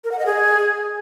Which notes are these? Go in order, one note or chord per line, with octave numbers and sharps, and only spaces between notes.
A#4
F#5
D#5
G#4